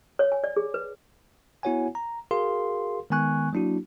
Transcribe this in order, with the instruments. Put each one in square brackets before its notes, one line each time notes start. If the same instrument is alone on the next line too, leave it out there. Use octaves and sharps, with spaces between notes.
[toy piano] C#5
G#5
D5
G#4
B4
[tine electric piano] B3 E4 F#4 C#5 F#5 G#5
A#5
F#4 G#4 A#4 F5 C6
D#3 G#3 B3 G#5 C#6 F#6
F#3 A#3 D4 E4 F#4